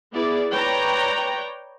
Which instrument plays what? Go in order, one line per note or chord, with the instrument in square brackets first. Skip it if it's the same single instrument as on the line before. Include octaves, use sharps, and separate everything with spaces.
[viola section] B3 E4 G#4 D5
B4 C#5 D5 G5 A#5